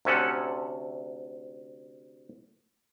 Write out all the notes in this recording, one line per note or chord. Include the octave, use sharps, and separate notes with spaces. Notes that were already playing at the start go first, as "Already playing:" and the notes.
D2 C3 C#4 A4 F#5